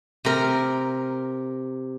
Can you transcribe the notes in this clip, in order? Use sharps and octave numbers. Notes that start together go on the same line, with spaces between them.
C3 A#4